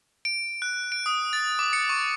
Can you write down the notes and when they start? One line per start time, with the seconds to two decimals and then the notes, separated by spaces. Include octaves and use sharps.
0.25 D7
0.62 F#6
0.92 D7
1.06 D#6
1.33 A6
1.59 D6
1.73 C#7
1.89 C#6